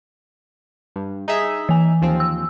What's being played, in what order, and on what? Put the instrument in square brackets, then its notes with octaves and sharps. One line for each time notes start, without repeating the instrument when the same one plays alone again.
[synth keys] G2
D#4 G#4 E5
[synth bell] E3 G#5
[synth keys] D#2 F3 C4
[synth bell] E6